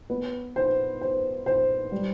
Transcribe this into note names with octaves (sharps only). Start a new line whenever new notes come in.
B3
C5
C5
C5
G3